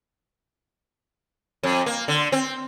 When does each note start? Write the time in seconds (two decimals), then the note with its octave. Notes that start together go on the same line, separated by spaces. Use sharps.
1.63 F2
1.86 A#3
2.08 D3
2.32 C4